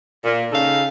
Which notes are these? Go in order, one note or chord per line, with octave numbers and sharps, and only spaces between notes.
A#2
C#3 C#4 D#4 A4 F5